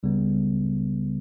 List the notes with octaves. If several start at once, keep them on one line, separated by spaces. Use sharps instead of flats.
C#2 C#3 G3 B3